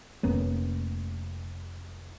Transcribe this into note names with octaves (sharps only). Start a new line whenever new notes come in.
F1 A#3 B3 C#4